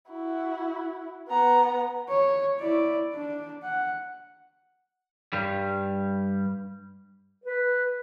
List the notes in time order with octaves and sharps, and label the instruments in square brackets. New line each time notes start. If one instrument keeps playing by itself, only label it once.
[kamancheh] E4 F#4
B3 A#5
[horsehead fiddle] C#5
E4 D5
D4
F#5
[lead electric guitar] G2 G3
[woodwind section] B4